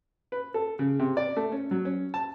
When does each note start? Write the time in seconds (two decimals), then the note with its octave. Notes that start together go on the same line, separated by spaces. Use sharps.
0.32 B4
0.54 A4
0.79 C#3
0.99 C3
1.17 D5
1.37 A3
1.52 C#4
1.71 F#3
1.85 C#4
2.14 A5